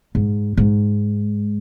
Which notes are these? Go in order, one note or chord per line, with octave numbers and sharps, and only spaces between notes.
G#2
G#2